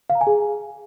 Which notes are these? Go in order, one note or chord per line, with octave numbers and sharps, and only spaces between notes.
F5
A#5
G#5
G#4